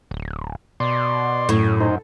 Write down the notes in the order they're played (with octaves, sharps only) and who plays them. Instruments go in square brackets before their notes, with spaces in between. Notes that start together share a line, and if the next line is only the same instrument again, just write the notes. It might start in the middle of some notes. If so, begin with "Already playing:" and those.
[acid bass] D1
[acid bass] B2 [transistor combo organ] D5 C6
[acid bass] F#2 [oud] A2
[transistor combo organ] D#4 C5